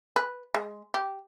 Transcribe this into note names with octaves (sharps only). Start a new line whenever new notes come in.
B4
G#3
G4